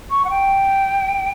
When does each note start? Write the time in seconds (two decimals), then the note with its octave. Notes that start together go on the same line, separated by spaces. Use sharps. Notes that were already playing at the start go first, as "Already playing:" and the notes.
0.11 C#6
0.25 F#5
0.30 G5